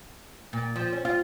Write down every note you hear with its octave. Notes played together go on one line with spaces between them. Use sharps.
A#2
F3
C#4
F4